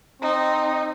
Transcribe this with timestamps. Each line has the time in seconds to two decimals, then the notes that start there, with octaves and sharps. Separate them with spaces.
0.22 C4 D#4